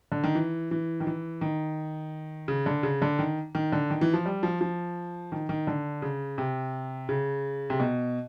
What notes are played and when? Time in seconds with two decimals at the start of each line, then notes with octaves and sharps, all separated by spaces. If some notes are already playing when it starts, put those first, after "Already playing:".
0.12 D3
0.24 D#3
0.35 E3
0.71 E3
1.00 D#3
1.07 E3
1.41 D#3
2.48 C#3
2.66 D3
2.83 C#3
3.02 D3
3.19 D#3
3.55 D#3
3.72 D3
3.90 D#3
4.01 E3
4.14 F3
4.26 G3
4.43 F3
4.61 F3
5.32 D#3
5.49 D#3
5.67 D3
6.02 C#3
6.38 C3
7.09 C#3
7.70 C3
7.80 B2